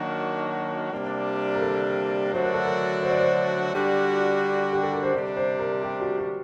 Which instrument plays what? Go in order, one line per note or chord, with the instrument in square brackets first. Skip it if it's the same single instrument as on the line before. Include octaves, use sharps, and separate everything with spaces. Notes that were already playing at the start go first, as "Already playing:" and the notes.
Already playing: [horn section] D#3 F#3 A#3 D4 F#4
C3 G3 A#3 D4
[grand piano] A#4
A4
[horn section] D3 F#3 A3 D4 F#4 [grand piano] C5
[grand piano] A#4
A4
A#4
C5
D5
C5
[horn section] D3 G3 D4 F#4
[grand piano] G4
A4
A#4
C5
[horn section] C3 G3 D4 [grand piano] D5
[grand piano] C5
A#4
G4
F#4
F#4